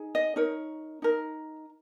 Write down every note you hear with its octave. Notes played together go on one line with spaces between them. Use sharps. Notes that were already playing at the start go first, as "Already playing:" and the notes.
Already playing: D#4 G#4
D#5
D#4 A#4 C#5
D#4 A#4